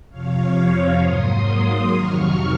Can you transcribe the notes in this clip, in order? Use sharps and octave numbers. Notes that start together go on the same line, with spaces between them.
F2 C3 F3 C#5 F5
G#2 F#3 A#3 C6 D#6
F2 C3 D#3 F#3 C#6 F6